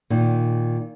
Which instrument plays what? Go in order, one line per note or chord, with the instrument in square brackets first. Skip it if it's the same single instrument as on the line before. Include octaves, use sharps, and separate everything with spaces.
[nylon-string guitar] A#2 D#3 D#4